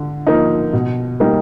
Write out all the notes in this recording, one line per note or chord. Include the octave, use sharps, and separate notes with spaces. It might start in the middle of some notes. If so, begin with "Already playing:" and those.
Already playing: D3
F3 A#3 D#4
B2
G3 A#3 D#4